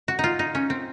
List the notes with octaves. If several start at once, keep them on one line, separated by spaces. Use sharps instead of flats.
F#4
D#4 F4
D#4
C#4
C4